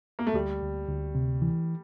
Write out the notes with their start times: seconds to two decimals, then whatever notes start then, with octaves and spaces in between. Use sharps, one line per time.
0.19 A#3
0.27 A3
0.34 D2 G3
0.62 D2
0.88 D2
1.15 C3
1.42 E3